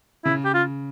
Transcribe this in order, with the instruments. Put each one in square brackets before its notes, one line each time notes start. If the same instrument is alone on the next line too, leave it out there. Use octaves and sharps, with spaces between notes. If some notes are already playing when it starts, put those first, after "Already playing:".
[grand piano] C#3 [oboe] E4
[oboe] G4
F4